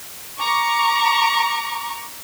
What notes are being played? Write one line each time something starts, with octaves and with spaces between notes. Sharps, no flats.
A#5 C#6 D6